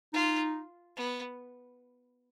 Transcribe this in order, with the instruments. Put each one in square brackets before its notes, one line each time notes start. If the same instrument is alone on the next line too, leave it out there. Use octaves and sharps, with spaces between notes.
[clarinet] D#4 [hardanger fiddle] F4
[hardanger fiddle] B3